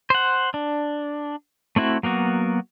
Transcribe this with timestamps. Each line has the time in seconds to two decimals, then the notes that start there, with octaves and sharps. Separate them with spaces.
0.10 C5 F#5
0.54 D4
1.76 A3 C4 E4 F#4
2.03 F#3 A#3 B3 F#4